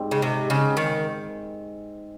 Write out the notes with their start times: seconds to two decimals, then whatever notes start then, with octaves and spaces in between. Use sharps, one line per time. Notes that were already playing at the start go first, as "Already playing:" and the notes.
Already playing: G#2 G3 C4
0.11 C#3
0.22 C3
0.50 C#3
0.77 D#3